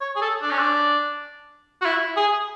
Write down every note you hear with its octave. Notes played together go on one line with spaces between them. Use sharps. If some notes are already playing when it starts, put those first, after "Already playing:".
C#5
G#4
A4
D4
C#4
D4
F#4
E4
G#4